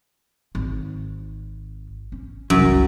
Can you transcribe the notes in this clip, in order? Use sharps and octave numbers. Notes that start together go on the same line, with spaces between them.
G#1
C#4
F#1 C2 F#2